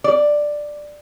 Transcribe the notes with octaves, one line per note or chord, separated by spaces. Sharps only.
D5